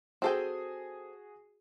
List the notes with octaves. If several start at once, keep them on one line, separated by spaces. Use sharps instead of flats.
C4 F#4 G#4 A4 G5 G#5